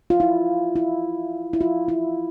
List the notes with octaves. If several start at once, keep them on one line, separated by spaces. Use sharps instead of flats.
F4
E4
E4
E4
F4
E4